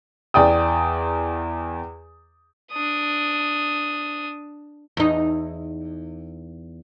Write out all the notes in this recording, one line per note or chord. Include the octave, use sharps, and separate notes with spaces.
E2 D5 G5 D#6
D4 D#6
E2 D#4